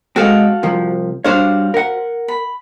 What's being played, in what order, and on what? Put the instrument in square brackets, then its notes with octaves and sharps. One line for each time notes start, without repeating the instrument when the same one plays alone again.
[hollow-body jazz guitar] G#3 C4 [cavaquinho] F#4 A4 F5
[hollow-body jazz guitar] C2 C3 F3
[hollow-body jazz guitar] G3 D4 C#5 [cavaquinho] F#4 C5 F5
[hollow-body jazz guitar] A#4 F#5
[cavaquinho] B5